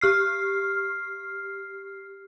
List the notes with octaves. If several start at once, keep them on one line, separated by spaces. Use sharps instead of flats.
G4 F6 C7